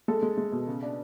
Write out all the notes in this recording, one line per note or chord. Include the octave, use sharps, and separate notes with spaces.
G#3 A4
G#3
G#3
B2
C#3
D4